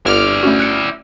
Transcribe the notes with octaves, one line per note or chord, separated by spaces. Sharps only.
G1 E4 D5 F6
A3 C#4 F#4
F#6 C#7